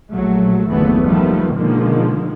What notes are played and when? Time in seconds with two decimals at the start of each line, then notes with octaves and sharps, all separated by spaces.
0.10 A#1 F#3 A3
0.70 F#1 D#2 D3 E3 A3 B3
1.05 D#3 F3 G3 A3 B3
1.54 B2 D3 D#3 F3 G#3 A#3